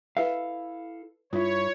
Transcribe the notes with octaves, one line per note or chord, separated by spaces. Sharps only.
E4 A4 B4 E5 F5
G2 E4 F4 C#5